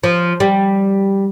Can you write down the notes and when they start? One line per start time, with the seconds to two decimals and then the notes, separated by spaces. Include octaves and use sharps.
0.04 F3
0.40 G3